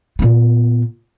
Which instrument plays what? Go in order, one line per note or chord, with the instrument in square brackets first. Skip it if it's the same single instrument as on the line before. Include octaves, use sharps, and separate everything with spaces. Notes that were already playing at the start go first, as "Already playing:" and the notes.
[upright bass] A#2 B3